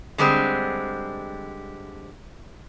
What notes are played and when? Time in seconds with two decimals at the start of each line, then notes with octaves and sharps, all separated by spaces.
0.18 D3 G3 G#3 C4